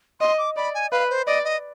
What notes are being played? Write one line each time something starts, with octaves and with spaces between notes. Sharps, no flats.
D#5 C6
D6
D5 B5
G#5
B4 F5
C5
D5 D#5
D#5